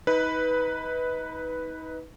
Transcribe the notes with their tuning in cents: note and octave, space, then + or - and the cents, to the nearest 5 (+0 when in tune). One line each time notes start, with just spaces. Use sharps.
D#4 +35 B4 +0